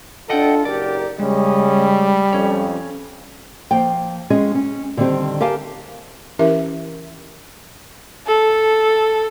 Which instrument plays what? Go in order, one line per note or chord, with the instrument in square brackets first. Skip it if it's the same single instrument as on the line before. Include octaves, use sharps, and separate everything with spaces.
[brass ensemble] D4 F4 A4 [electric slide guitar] D#5 F#5 G5
[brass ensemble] F#1 G4 A#4 [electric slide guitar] D5
[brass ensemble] C#3 C#4 D#5 [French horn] G3 [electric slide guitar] G#3
[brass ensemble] F2 [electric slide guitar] C#4 C#5
[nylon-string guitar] F3 A#3 G5
G#3 C#4 F4 G#4 D#5
C#4
D3 D#3 G3 C4 G4
G4 A#4 F5 G#5 A5
[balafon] E3 C#4 E4 G4 A#4 E5
[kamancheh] A4